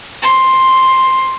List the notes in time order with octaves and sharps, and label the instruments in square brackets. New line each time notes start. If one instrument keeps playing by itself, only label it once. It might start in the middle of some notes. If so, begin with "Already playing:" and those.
[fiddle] C6